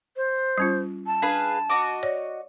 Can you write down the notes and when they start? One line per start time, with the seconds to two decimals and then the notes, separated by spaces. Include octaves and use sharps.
0.17 C5
0.58 G3 C#4 F4
1.07 A5
1.22 D4 G#4 B4 F5
1.69 F#4 D#5 D6
2.03 C#5 D5